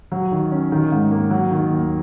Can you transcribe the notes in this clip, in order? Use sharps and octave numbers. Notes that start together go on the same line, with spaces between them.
F#3
D#3
C#4
D#3
G#2
A#3
F#3
D#3
D#2